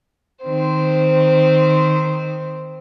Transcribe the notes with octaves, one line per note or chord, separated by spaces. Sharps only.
D#3 C4 C5